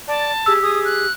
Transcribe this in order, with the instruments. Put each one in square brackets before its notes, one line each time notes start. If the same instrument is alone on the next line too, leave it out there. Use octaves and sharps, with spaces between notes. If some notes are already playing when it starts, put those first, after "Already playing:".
[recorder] D5 [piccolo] A5
[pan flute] G4 [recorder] G#4 [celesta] E6
[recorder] G#4 [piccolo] D#6
[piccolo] F#6